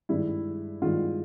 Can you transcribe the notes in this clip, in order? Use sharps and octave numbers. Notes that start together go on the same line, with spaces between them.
G2 D#3 G#3 E4
G2 D#3 G#3 F4